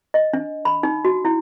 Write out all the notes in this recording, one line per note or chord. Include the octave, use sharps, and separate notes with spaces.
D#5
D4
B5
D#4
F#4
E4